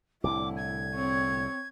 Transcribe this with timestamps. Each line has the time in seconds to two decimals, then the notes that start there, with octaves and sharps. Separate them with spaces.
0.24 C2 A2 D3 E4 D6
0.56 G#6
0.96 C4 C#5